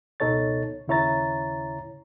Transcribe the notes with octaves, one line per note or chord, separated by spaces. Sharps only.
C#2 B2 D#4 A4 C#5 A6
D#2 C#3 E4 C#5 A#5 A6